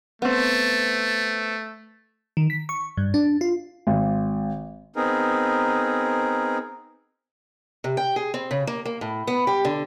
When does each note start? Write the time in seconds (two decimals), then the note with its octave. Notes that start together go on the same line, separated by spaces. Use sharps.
0.22 A3 B3 C4
2.37 D#3
2.50 B6
2.69 C#6
2.97 G2
3.14 D4
3.41 F4
3.87 G#1
4.96 B3 C4 D#4 G#4 A#4
7.84 C3
7.97 G5
8.16 G#4
8.34 C4
8.51 C#3
8.67 A#3
8.85 A#3
9.01 A2
9.27 B3
9.47 G4
9.65 D3